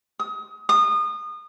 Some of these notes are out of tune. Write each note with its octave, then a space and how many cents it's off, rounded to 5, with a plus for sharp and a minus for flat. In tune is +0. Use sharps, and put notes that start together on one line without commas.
D#6 +30
D#6 -30